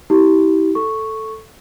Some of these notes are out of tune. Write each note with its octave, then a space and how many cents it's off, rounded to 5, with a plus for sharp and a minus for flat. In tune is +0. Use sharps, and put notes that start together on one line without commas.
E4 -40 G4 -20
A4 +0 C#6 +0